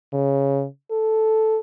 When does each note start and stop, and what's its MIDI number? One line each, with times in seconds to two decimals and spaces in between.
0.13 0.65 49
0.91 1.59 69